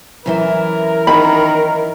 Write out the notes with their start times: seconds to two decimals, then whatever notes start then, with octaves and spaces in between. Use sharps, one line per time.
0.26 F#2 E3 E4 A#4
1.07 D#3 B5